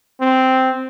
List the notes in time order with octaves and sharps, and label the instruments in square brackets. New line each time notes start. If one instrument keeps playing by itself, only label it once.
[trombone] C4